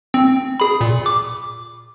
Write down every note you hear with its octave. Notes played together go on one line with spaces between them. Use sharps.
C4
G#4 B5
A#2
D6